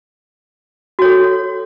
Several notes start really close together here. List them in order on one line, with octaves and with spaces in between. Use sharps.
F#4 C#5 A4